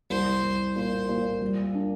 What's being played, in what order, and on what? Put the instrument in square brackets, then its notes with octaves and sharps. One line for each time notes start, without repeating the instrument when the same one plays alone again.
[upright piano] C2 [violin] C5
[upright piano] C2
[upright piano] A#2 [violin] C5
[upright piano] A#2
G3
D4